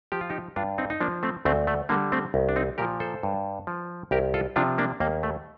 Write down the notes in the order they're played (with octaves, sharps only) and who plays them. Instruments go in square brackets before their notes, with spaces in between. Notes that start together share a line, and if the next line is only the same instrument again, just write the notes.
[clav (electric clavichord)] F3 G4
F4
D#4 G4
G2 D4 F4
C4 D#4
D#4
F3 A#3 D4
A3 C4
D2 A3 C4
A3
D3 G3 A#3
A3 C4
C2
D4
C4 D#4
A#2 F3 G4 A#4
A4 C5
G2
F3
C2 G4 A#4
F4 A4
C3 F3 D4 F4
A#3 D4
D#2 A#3
A3